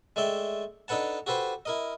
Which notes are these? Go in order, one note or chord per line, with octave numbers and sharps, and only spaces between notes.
G#3 A3 D5 E5 G5
D4 D#4 A4 B4 F#5 A5
F#4 G4 A4 B4 C5
E4 A#4 D#5